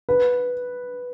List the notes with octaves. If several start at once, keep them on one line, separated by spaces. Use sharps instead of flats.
B4